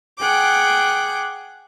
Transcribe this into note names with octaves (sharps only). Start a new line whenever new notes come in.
G#4 F#5 G5 D6